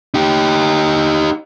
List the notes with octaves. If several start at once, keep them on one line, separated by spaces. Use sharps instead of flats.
D#4 G4